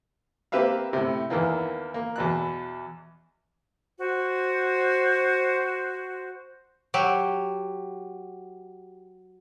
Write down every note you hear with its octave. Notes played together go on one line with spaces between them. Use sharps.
A#3 C4 G4 B4 E5 F5
A2 C3
E2 D#3 E3 A#3
A#3
E2 B2 F#6
F#4 C5
F#3 G4